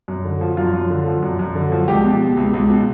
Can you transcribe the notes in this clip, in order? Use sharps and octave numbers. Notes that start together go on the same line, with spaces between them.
F#2
D3
F3
F#2 F4
F#2
D3
F3
F#2
F#2
D3
F3
C#2 G4
B2
B2
C#2
C#2
B2